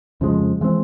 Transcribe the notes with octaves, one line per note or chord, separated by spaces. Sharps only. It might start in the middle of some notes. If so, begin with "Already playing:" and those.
F2 C#3 F3 G#3
E3 G#3 C4